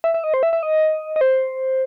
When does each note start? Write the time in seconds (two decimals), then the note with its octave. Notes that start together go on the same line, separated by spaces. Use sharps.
0.04 E5
0.14 E5
0.24 D#5
0.34 C5
0.43 E5
0.53 E5
0.63 D#5
1.16 D#5
1.21 C5